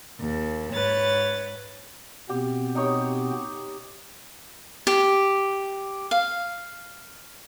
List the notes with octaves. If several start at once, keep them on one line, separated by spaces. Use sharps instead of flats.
D#2
G#2 B4 C#5 A6
B2 B3 C4 G4
D#4 G4 C#5
G4
F5